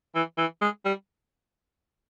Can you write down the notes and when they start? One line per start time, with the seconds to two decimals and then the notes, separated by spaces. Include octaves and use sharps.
0.15 E3
0.38 E3
0.62 G#3
0.85 G3